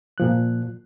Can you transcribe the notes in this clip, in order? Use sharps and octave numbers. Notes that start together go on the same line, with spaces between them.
A#2 F3 F#6